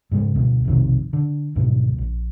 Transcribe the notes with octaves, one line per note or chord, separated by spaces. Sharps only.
G#2 C#3 G#3
D2 B2
B1 F2 C3 D#3
D3
D2 G#2 B2 F#3
A#1